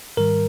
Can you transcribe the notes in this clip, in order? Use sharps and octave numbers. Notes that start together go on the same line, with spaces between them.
G#2 D#3 G3 A#4